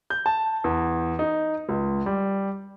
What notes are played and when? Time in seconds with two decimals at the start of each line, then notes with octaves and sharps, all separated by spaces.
0.10 G6
0.26 A5
0.64 E2
1.19 D#4
1.69 C#2
2.06 G3